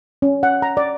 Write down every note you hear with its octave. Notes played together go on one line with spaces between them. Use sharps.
C#4
F#5
A#5
D5